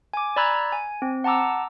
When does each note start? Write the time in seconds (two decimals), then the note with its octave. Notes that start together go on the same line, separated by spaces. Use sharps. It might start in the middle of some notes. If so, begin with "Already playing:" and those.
0.13 G#5 D6
0.36 D5 A#5 B5 E6 F#6 G#6
0.72 G#5
1.02 C4
1.24 F#5 A5 A#5 D6 E6